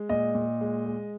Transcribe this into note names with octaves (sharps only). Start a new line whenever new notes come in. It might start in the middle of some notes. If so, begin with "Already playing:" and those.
Already playing: G#3
A#2 D#5
A#2
G#3
G#3